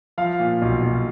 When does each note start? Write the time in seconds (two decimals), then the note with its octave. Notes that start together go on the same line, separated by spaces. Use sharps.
0.18 F3 F5
0.40 A#2
0.62 B1
0.83 B1